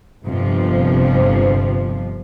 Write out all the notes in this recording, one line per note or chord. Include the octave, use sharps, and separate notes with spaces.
G1 F2 C3 F3